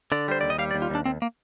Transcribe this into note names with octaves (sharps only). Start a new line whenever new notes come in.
D3 D5
G3 C5
D#2 D5
D#5
G3 F5
D5
D#2
F4
D#2 D4
D#2 C4
A#3